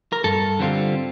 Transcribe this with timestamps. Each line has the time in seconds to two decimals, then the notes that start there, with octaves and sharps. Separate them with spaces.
0.13 A#4
0.24 G2 A4
0.59 D3 G3 C4 F4